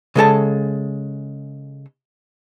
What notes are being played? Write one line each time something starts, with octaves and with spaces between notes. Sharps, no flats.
C#3 G#3 A4 A5